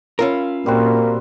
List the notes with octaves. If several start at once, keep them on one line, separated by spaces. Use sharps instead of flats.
C#4 F4 A#4 E5 F5 B5
A#2 G3 A#3 C4 F#4